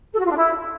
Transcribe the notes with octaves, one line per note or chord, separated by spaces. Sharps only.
A4
F#4
F4
D4
E4